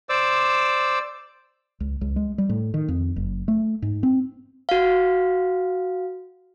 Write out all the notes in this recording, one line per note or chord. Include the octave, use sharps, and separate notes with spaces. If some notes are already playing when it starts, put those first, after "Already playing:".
C5 D5 D6 E6
C#2
C#2
G#3
G3
A2
D#3
F2
F#1
A3
G#2
C4
F#4 F5